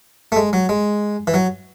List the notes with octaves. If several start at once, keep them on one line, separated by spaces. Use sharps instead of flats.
A3
G#3
F#3
G#3
E3
F#3